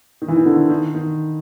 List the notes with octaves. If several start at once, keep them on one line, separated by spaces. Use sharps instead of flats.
D#3
E3
D#3
D3
D#3
D#3